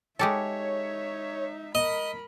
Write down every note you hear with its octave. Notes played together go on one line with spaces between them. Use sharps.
G#3 D#4 G4 A4 C#5 E5
A#4 D#5 B5